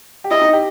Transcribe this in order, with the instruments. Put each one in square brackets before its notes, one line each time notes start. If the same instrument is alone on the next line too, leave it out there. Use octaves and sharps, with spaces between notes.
[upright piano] G4
[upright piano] E4 [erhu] D#5
[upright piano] D#4
G4